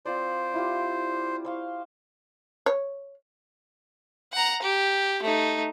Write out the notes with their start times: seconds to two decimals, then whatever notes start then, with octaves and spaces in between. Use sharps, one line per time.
0.05 C4 F4 C5 D5
0.54 E4 F4 G4
1.45 C5 F5 C#6
2.66 C#5
4.33 F#5 A#5
4.62 G4
5.23 A3 D#4